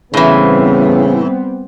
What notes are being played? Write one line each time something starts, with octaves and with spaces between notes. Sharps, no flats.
A2 C#3 E3 G3 B3 C4